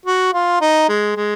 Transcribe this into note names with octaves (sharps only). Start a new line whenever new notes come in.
F#4
F4
D#4
G#3
G#3